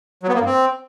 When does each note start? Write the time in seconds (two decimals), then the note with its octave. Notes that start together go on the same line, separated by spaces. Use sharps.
0.23 F#3
0.29 B3
0.34 A#3
0.40 G2
0.46 C4